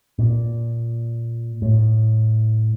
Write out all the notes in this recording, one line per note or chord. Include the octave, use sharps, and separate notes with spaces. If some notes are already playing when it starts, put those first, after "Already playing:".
A#2
A2